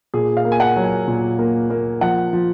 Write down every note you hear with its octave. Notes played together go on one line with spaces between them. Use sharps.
A#2 G#4
F5
A#3
G#5
F#5
F#3
G#5
A#2
A#3
A#3
F3 F#5
F3